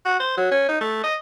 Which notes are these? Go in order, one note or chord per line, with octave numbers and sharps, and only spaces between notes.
F#4
C5
F#3
C#4
D#4
A3
D#5